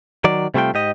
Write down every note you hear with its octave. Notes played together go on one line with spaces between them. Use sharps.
D#3 F#3 D5
C3 G3 A3 F4 G5
G#2 G4 D#5